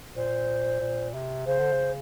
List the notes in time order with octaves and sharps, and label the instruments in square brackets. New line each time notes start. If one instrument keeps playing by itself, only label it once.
[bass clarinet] A#2 [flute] C5
[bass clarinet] A#2
C3
[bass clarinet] C#3 [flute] C5
[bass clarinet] D3
C#3